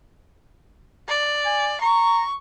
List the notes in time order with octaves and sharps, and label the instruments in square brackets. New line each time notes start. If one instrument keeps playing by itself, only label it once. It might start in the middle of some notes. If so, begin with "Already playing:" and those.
[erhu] D5
[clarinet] G#5
[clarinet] A#5 [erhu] C#6